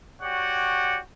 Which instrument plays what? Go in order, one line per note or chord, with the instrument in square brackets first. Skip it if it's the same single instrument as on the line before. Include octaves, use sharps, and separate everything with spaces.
[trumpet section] F#4 G4 C#5 D5 F#5 G5